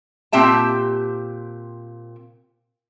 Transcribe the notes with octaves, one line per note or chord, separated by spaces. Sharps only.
A#2 C4 G4 E5 A5